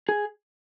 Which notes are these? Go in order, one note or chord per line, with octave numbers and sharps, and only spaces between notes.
G#4